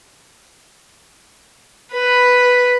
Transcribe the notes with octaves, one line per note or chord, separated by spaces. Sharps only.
B4